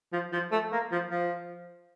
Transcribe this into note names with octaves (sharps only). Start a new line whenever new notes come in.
F3
F3
A3
A#3
F3
F3